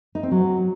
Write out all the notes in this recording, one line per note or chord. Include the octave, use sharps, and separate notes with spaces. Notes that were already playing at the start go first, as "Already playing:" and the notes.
D#4
C4
F#3